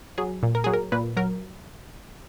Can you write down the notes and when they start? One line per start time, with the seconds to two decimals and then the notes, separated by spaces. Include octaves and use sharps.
0.18 F#3 G#4
0.43 A#2
0.55 A#4
0.64 F#3 G#4
0.74 A#4
0.92 A#2 B4
1.17 F#3 A#4